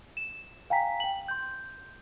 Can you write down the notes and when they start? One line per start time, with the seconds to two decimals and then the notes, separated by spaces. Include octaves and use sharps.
0.17 E7
0.70 F5 G5 G#5 A#5 B6
1.00 G5 F#7
1.28 C6 G6